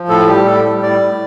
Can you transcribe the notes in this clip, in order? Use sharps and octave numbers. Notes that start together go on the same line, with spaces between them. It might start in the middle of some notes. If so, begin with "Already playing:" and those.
Already playing: F3
A2 A4
G3 G4
A2 A4
G3
A2 D5
A2